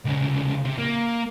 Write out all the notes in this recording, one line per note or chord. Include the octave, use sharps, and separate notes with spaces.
C2 C#3
C3
A#3